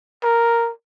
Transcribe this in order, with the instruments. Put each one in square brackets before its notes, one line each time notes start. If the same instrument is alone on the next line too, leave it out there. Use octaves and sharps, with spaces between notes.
[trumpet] A#4